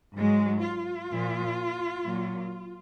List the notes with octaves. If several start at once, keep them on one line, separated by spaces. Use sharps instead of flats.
G#2 F#3 G#3
F4
A#2 F3
A#2 F#3